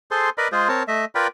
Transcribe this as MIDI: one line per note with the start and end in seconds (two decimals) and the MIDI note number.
0.11 0.30 68
0.11 0.30 69
0.11 0.30 72
0.11 0.30 84
0.38 0.48 70
0.38 0.48 71
0.38 0.48 74
0.38 0.48 75
0.38 0.48 83
0.52 0.68 56
0.52 0.68 65
0.52 0.68 68
0.52 0.68 72
0.69 0.83 60
0.69 0.83 70
0.69 0.83 73
0.69 0.83 81
0.88 1.05 57
0.88 1.05 75
0.88 1.05 76
1.15 1.27 65
1.15 1.27 70
1.15 1.27 71
1.15 1.27 74
1.15 1.27 79
1.15 1.27 83